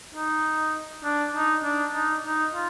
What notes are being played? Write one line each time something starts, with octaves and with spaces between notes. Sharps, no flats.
D#4
D4
D#4
D4
D#4
D#4
F4